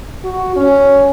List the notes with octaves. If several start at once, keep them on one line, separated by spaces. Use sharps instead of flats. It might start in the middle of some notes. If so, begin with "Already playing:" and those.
F#4
C#4